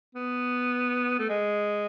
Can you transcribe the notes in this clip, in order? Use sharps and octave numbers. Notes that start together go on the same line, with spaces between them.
B3
A3
G#3